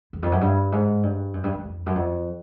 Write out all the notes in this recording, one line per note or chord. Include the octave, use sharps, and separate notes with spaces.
E2
F2
F#2
G2
G#2
G2
F#2
G2
F#2
F2
F#2
F2